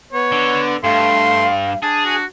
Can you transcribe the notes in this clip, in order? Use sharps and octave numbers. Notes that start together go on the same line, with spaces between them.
B3 C#5
D3
G2 A3 F5 C6
D4 G#4 A5
F#4